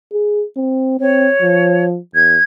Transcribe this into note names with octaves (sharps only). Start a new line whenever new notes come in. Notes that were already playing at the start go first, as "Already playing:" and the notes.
G#4
C4
C4 C#5
F3
E2 G#6